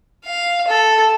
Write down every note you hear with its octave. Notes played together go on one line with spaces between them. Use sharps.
F5
A4